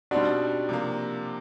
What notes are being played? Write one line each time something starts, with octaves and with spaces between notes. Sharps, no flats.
B2 G3 C4 D4 D#4 F#4
C3 F3 A#3